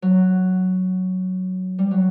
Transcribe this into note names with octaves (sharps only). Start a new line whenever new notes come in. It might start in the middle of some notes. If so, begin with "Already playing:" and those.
F#3
G3
F#3